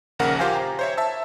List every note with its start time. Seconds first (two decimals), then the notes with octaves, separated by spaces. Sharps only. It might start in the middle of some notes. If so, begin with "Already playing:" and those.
0.19 A#1 D#2 C#3 A#4 F#5
0.39 F4 G4 C5 F5 G5 G#5
0.55 A#5
0.79 C5 C#5 E5
0.97 E5 A5 E6